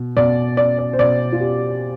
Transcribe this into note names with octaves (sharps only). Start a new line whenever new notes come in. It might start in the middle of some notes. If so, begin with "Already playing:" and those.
Already playing: B2
B2 D5
D5
D5
C5
B2 D5
F4
G4